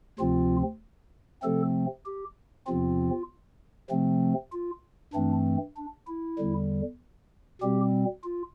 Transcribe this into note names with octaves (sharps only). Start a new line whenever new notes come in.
D2 C3 F3 C4 F4
C3 F3 A3 C4 A4
G4
E2 C3 F3 C4 F4
C3 F3 A3 C4
F4
G2 E3 A3 C4 D4
D4
E4
E2 D3 G3
B2 G3 C4 G4
F4